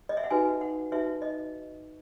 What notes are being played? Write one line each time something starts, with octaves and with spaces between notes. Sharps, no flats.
D#5
E5
F#5
D#4 F#4 B4 G#5
F#5
D#4 F#4 B4 E5
D#5